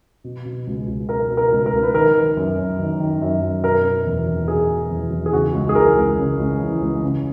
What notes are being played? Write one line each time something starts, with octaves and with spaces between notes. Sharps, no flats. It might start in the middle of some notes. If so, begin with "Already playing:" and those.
B2
B2
C#2
C#2
B2 A#4
B2
A#4
C#2
A#4
C#2
B4
D#3 A#4
D#3
F#2
F#2
D#3
D#3
F#2
F#2
B2 A#4
B2
E2
E2
B2 G#4
B2
E2
E2
G#4
C#3 F#4
C#2
G#4
E3 A#4
C#2
C#3
C#2
E3
C#2
C#3